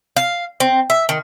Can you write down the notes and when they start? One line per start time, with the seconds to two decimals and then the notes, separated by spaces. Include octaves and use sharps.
0.16 F5
0.60 C4
0.90 E5
1.09 D#3